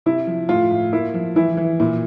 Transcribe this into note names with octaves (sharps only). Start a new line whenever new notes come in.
C3 E4
F3
A2 F4
A2
A#3 E4
F3
E3 E4
E3
A#2 E4